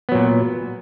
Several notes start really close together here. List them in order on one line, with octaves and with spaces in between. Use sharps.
B3 F#3 A#2